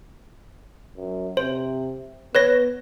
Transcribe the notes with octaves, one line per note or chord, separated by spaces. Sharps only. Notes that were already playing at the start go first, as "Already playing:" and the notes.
F#2
C3 C5
B3 B4 C#5 A#6